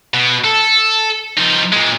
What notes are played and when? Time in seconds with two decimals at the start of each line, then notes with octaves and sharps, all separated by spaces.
0.14 B2
0.44 A4
1.37 F3 D#4
1.72 A#2 G#3